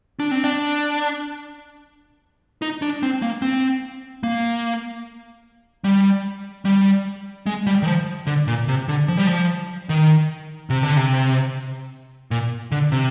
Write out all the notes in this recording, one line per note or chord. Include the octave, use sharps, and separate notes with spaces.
D4
C4
D4
D#4
D4
C4
A#3
C4
A#3
G3
G3
G#3
G3
D#3
F3
D3
A#2
C3
D3
F3
G3
F3
D#3
C3
D3
C3
A#2
D3
C3